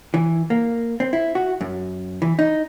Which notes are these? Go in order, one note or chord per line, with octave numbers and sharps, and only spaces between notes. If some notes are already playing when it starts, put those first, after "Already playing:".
E3
A#3
C4
E4
F#4
F#2
E3
D#4